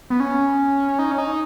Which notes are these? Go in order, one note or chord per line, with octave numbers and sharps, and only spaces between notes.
B3
C#4
D#4
C#4
D#4